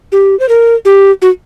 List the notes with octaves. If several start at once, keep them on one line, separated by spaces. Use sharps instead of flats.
G4
C5
A#4
G4
F#4